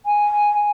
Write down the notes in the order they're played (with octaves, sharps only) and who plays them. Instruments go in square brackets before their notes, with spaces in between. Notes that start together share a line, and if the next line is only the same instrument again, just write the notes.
[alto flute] G#5